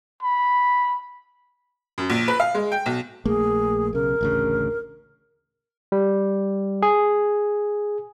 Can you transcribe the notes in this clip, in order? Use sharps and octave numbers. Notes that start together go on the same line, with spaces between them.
B5
F#2
A#1
B4
F5
G#3
G5
B1
A#1 A3 A#3 G#4
B1 C#3 A#4
A1 D2 C#3
G3
G#4